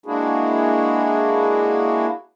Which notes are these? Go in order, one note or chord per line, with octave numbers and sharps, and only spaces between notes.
G#3 A#3 D4 E4 F#4 G#4